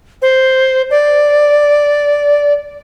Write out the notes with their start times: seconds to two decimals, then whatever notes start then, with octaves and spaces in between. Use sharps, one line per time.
0.22 C5
0.90 D5